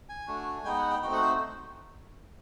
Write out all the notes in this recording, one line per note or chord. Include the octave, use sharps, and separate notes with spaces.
G#5
A3 D4 F#4
G#3 B3 D#4 G5
F#5
G5
A3 C4 D#4 F#4 G5
F#5
C5